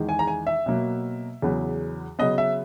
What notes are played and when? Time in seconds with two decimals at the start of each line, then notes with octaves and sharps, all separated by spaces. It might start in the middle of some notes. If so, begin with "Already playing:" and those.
Already playing: E2 D#3 G#3
0.09 G#5
0.19 A#5
0.27 G#5
0.47 E5
0.66 B2 F#3 A#3
1.42 E2 C#3 F#3 B3
2.19 C#3 F#3 B3 D#5
2.38 E5